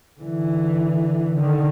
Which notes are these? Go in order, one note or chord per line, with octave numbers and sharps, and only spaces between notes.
D3 E3
D3 D#3